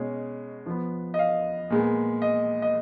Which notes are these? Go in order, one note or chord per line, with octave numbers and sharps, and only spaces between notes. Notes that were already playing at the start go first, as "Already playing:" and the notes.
Already playing: B2 G#3 C#4
F3 B3
D#5
F5
A#2 G#3 B3
D#5
D#5